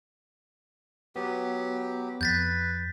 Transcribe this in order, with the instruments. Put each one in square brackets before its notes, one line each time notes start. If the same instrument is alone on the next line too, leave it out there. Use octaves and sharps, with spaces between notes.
[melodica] F#3 G4 [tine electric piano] B3
[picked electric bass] F2 [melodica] B4 [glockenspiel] G6 A6 B6